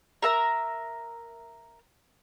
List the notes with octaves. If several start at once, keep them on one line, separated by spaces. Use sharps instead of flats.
A#4 E5 A#5